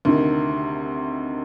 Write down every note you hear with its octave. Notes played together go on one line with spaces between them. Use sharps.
D2 C3 D#3